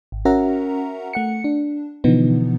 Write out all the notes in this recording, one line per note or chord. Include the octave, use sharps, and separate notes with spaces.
G#1
C#4 F#4 A#4 E5 F#5 A#5
A3 F#5 C#7
D4
B2 D3 E3 F3 B3 D#4